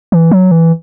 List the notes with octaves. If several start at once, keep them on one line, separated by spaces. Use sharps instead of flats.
E3
F#3
E3